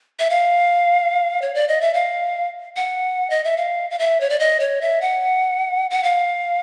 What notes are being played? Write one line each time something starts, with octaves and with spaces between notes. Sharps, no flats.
E5
F5
C#5
D5
D#5
E5
F5
F#5
D#5
E5
F5
F5
E5
C#5
D5
D#5
C#5
E5
F#5
F#5
F5